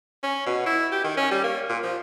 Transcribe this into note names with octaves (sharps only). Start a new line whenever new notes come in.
C#4
B2
E4
G4
D#3
C#4
G3
A#3
A#2
F3